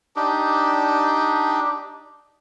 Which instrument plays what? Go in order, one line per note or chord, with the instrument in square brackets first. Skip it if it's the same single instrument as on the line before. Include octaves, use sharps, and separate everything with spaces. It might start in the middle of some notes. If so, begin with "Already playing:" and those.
[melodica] D4 D#4 G4